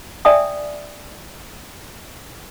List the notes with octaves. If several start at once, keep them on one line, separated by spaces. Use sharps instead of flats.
D5 E5 G5 G#5 D#6